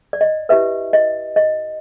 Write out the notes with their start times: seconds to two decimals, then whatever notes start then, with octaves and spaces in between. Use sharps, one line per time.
0.13 D5
0.21 D#5
0.49 E4 G4 B4 E5
0.93 D#5
1.36 D#5